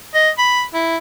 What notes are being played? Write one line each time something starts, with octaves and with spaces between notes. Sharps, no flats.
D#5
B5
E4